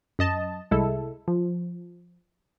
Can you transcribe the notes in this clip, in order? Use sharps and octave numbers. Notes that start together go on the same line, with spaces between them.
F#2 D#5 A5
C2 G#3 E4 A4
F3